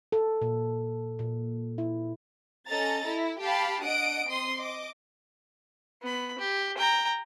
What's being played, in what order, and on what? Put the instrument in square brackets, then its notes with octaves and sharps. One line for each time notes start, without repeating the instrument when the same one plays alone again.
[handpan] A4
A#2
A#2
E4
[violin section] C#4 A4 D#5 A#5 A6
E4
G4 F5 A5 B5
D4 D#5 F#5 D#6 D7
C4 C6 D#6
D#5 D6
[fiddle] B3 B5
G4
G5 A#5